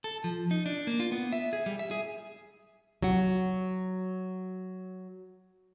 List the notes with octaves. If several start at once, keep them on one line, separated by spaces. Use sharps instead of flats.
A4
F3
D#4
D4
A#3
F4
B3
E5
G#4
G3
E5
G#4
F#3 F#4